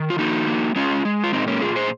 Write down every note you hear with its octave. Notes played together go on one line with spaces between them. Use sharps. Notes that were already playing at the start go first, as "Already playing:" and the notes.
Already playing: D#3
F4
A#3 D#4 F#4
A#3
G#3 C#4 F4
G#3
F4
A#2 C4 D#4
A#3 C#4
A#2 F4 G#4
G#4 C5